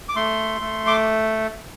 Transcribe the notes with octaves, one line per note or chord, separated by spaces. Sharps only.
D6
A3 C6
A3
D6